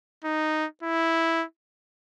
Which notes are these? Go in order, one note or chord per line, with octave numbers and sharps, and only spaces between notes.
D#4
E4